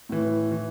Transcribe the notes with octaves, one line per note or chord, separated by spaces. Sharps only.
A2 E3
E3